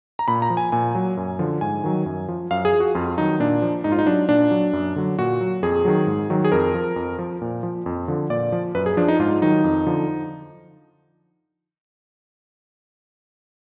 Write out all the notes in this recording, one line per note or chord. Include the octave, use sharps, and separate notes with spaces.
A#5
A#2 B5
A#5
F3
G#5
A#2 G#5
F#3
F#2
D3 F3
G#2 G#5
D#3 F#3
F#2
F3
F#2 F5
G#4
F3
F#4
F2 F4
D#3 F#3 D#4
A#2 D4
F3
G#2 D#4
F4
D#4
F#3 D4
A#2 D4
F#3
F#2
D3 F#3
A#2 F#4
F#3
F2 G#4
D#3 F#3
G#2
D#3 F#3
G#4
F2 A#4
F3
F2
F3
A#2
F3
F2
D3 F3
A#2 D5
F3
F#2 B4
G#4
F3 D4
D#4
G#2 F4
D#3 F#3 D#4
F2
D3 F3